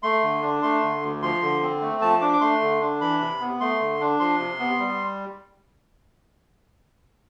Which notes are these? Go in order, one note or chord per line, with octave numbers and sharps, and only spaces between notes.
A3 C6
D3
D4
A3 C6
D3
D2
F3 C6
D3
C4
A3
F3 A5
D4 D6
D6
A3 C6
D3
D4
E3 B5
C3
B3
A3 C6
D3
D4
F3 C6
C3
B3
G3